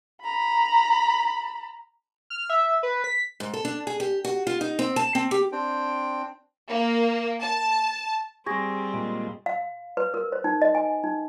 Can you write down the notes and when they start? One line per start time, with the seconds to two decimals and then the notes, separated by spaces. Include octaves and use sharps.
0.23 A#5 B5
2.30 F6
2.50 E5
2.83 B4
3.04 B6
3.40 G#2
3.53 A4
3.65 D4
3.87 G#4
4.00 G4
4.25 F#4
4.47 F4
4.61 D#4
4.79 C4
4.96 A5
5.15 C4
5.31 G4
5.52 C4 D4 G5
6.68 A#3
7.41 A5
8.46 G3 C4 G#4 C#6 G#6 A#6
8.94 A#2 G#3
9.46 F5
9.97 B4
10.14 A#4
10.32 C5
10.44 D#4
10.62 D#5
10.75 G#5
11.04 D#4